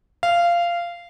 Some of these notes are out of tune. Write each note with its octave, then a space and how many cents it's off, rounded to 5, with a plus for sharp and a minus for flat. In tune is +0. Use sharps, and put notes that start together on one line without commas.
F5 -15